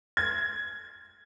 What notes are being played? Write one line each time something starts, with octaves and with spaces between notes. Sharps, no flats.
G#6